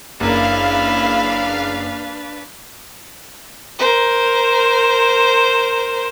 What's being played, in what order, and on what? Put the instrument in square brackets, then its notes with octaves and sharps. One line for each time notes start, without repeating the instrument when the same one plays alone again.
[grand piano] F#1 A#4 [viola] D4 B4 [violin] E4 [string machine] F5
[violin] A#4 C5